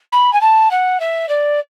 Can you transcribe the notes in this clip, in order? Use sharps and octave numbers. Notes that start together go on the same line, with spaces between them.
B5
G#5
A5
F#5
E5
D5